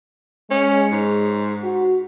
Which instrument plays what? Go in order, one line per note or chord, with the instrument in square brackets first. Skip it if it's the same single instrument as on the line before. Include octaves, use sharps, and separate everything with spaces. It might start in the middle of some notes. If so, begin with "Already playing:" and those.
[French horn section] G#3 [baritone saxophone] C#4
[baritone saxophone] G#2
[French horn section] F#4